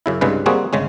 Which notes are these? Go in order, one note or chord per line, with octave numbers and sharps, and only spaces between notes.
F#2 C#3 E4
C2 G2 C#3 G#3 B4
G3 G#3 A#3 C4 F#4 G#4
G1 C#3 G#3 C#4